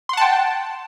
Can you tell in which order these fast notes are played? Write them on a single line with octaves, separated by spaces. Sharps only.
C6 F#5 A5 G5